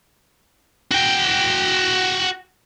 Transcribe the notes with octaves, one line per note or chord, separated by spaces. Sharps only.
F#4 G5